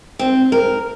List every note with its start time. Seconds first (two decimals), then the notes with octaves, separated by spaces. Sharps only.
0.19 C4
0.52 A#4